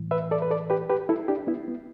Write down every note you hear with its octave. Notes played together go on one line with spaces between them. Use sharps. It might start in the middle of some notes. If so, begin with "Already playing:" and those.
Already playing: A2 E3
B4 E5
A4 D5
B4
A4 D5
G4 B4
G4 B4
E4 A4
D4 G4
B3 E4
B3